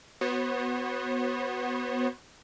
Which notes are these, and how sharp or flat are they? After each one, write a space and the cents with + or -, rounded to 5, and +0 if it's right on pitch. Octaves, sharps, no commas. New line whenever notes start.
B3 +0 F#4 +0 C5 +45